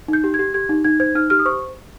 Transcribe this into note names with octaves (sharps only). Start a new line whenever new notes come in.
D#4 G6
G4
G#6
G4
G4 G#6
D#4
D#4 G#6
C5 G#6
D#4 F6
G4 F6
D#6
C5 C#6